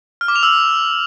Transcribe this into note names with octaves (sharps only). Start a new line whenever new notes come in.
F6
D6
F7
E6